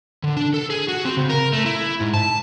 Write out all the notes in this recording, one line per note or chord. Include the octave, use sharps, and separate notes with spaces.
D3
D4
A4
G#4
F#4
C4
C#3
A#4
A3
E4
G#2
A5